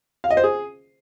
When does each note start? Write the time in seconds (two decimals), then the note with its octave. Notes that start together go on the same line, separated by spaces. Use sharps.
0.24 F5
0.31 D#5
0.37 C5
0.44 G#4